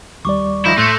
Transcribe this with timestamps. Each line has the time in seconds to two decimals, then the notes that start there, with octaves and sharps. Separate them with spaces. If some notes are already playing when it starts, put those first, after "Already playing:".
0.25 D#2 G3 D5 C#6 D6
0.66 D#3 F3 E4 G6 A#6
0.78 A2 A3 C6 E6 F#6 G6 A6